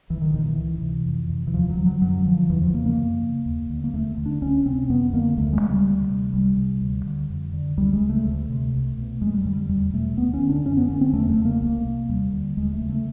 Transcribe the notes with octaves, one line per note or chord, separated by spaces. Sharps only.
C2 E3
D#3
A#2 D#3
E3
C#2
C3
F2
C3
E3
D#2 F3
F#3
D3
F#3
F#2 F#3
D3 F3
E2 E3
F3
C#3 A#3
A#3
F#2
C#3
D#2
D3
A#3
D#2 A3
D3
D4
C#2 C#4
C3 C4
F2 B3
D3 A#3
D2 A3
G#3
C#3
G3
D2
C3
C2 G3
C3
D2
D3
F2
D3
C#2 G3
G#3
C#3
A3
D2
C3
C2
B2
F2 G#3
G3
D3 G3
G3
E2 G3
B2 A3
D2 B3
C#4
D3
D4
F#2 C#4
B3
D3 C#4
C4
E2 A3
A3
C#3
A#3
C2 A#3
C3
D#2 G3
D3
D#2 G#3
A3
C#3
A3